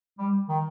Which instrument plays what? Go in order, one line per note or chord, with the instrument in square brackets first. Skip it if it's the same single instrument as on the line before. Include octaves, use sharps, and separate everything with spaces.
[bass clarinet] G3
D#3